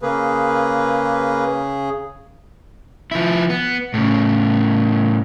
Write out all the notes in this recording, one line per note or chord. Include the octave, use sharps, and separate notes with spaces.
C#3 A#3 G#4 B4
F3 E4
B3
A2 C#3